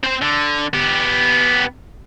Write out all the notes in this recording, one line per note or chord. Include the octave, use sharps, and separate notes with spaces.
C4 C5
D3
B3 G4